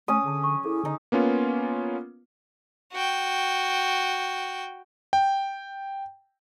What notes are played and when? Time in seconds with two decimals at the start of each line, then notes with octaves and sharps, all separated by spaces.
0.08 A3 C#4 D#6
0.25 D3 G#4 A5
0.43 C#6
0.65 E4 G#4 A4
0.85 D3 D#4
1.12 A#3 B3 C#4 F4
2.93 F#4 G5
5.13 G5